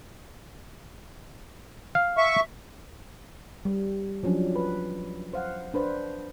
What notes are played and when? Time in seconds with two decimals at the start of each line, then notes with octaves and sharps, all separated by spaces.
1.95 F5
2.17 E5 C#6
3.65 G3
4.23 F3 F#3 C#4 D4
4.56 B4
5.33 C5 F5 F#5
5.74 D4 B4 C5